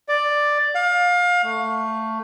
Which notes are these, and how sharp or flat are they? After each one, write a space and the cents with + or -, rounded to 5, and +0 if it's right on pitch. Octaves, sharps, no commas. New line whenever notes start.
D5 +5
F5 +30
A3 +15